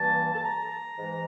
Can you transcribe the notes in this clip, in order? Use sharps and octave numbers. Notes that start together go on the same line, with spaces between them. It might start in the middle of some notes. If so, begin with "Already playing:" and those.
Already playing: G2 E3 G3 A#3 A5
A5
A#5
G#2 E3 G#3